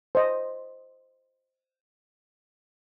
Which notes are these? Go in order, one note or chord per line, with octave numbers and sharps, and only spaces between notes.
C5 D#5